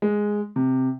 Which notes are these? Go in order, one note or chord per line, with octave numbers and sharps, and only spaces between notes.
G#3
C3